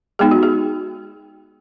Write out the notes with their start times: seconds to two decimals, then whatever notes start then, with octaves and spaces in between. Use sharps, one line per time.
0.19 G#3 B3 D#4 G#4
0.31 F#4
0.43 G#4